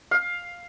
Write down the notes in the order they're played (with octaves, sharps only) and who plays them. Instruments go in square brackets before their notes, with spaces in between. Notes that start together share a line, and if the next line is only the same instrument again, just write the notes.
[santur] F5